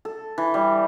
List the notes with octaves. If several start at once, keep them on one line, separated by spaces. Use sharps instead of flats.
A4
E3
G3